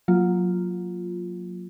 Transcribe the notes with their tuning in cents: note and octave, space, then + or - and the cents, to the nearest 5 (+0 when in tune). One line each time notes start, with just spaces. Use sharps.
F#3 -25 A#3 +0 F4 +0